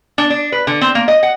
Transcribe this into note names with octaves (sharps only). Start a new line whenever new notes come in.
D4
D4
B4
D3
C4
A#3
D#5
F#5